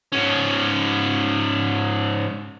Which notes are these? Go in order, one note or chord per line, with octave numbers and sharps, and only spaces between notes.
G#2 C#4